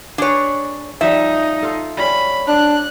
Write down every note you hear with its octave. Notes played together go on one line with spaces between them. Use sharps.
D4 G#4 B4 C#5
F3 G3 D#4 E5
F4 A4
G3 C#4 B5
D4 F#6